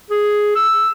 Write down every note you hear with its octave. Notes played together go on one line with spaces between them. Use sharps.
G#4
E6